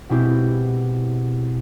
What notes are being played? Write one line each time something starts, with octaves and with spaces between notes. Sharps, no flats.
B2 G#3 C4 E4 G4